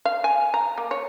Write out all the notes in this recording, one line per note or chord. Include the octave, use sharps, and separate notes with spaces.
F5
G#5
A#5
A#3
C#5